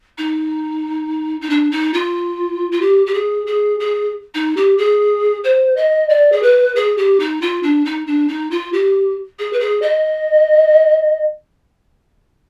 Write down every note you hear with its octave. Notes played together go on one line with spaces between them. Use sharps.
D#4
D#4
D4
D#4
F4
F4
G4
G4
G#4
G#4
G#4
D#4
G4
G#4
C5
D#5
D5
G#4
B4
G#4
G4
D#4
F4
D4
D#4
D4
D#4
F4
G4
G#4
B4
G#4
D#5